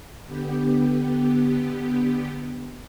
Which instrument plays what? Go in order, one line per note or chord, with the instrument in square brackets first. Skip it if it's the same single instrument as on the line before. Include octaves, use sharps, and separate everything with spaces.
[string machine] D3 B3 G4